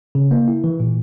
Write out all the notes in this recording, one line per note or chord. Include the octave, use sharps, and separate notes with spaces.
C#3
A#3
E4
E3
A#2